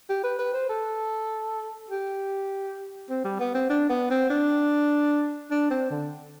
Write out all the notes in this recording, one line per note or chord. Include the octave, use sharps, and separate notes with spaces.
G4
B4
B4
C5
A4
G4
C4
G3
B3
C4
D4
B3
C4
D4
D4
C4
D3